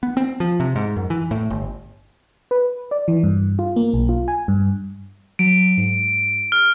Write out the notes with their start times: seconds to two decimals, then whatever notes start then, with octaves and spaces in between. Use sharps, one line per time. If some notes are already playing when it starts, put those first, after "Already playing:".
0.03 B3
0.17 C4
0.40 F3
0.60 C3
0.76 G#2
0.96 F#2
1.10 E3
1.31 A2
1.50 G1
2.51 B4
2.91 D5
3.08 E3
3.23 G2
3.59 F4
3.76 A#3
3.94 B1
4.09 F4
4.28 G#5
4.48 G2
5.39 F#3 D7
5.77 G#2
6.52 F6